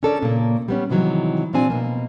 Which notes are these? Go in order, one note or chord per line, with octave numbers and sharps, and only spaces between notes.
C#4 D4 A4 A#4 D5
A#2 C#3 A#3
G3 B3 C#4
C3 D#3 E3 F#3 G#3
A#2 F3 G3 C4 D4 G#5
B2 A#3